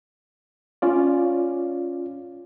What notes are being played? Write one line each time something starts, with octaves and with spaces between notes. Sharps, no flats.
C#4 F4 D5